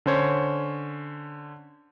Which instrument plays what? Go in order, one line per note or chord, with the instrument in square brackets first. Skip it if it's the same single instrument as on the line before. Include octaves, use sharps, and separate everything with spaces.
[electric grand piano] D3 C#4 C5 C#5